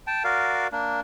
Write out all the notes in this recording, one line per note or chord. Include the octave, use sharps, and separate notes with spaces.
G5 A5
F#4 A#4 D5 F5
A#3 D4